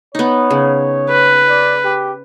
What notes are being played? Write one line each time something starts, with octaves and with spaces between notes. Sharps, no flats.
B3 D#4 C#5
C#3
B4
D5
G4